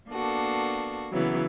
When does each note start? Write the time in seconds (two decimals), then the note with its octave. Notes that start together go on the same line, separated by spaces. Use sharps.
0.10 A#3 B3 D4 F#4 A4
1.12 C#3 E3 F#3 B3